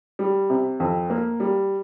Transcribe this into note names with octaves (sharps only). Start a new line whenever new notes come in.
G3
C3
F2
A#3
G3